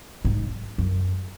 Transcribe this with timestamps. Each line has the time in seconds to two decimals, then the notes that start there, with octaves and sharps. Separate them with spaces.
0.25 G#2
0.78 F#2